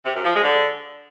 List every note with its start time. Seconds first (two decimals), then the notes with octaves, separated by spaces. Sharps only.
0.05 C3
0.15 F#2
0.25 F3
0.34 G#3
0.44 D3